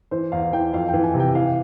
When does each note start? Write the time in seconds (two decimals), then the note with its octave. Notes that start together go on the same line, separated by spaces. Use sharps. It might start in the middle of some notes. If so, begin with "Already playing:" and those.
0.11 E3 C5
0.32 E2 F5
0.53 E3 G5
0.73 F2 F5
0.88 G5
0.94 E3
1.04 G#5
1.14 C3
1.20 G5
1.34 E3 F5